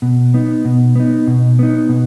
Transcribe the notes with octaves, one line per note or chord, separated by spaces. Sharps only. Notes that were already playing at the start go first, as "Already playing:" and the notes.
B2
B3 D#4
B2
B3 D#4
B2
B3 D#4
B2